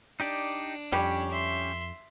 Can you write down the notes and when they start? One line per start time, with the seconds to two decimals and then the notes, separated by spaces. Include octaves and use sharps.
0.20 D4 D#4 G4 D5
0.92 F2 G3 C#4 G4 C#5
1.30 E5 C6